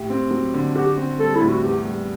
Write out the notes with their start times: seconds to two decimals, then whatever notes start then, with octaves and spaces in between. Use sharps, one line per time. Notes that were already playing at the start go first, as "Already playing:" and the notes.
Already playing: A2 G4
0.10 C4
0.31 F#3
0.54 D3
0.75 F#4 G4
0.97 C4
1.19 G3 A4
1.36 E4
1.41 A2
1.49 F#4
1.63 E2 G4
1.85 G3